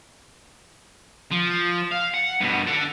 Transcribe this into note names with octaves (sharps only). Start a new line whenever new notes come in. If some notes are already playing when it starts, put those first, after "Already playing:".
F3
F5
F#5
G2 B2
D4 F#5